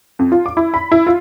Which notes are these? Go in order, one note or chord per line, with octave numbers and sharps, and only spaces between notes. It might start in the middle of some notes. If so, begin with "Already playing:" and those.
F2
F4
D6
E4
B5
E4
F4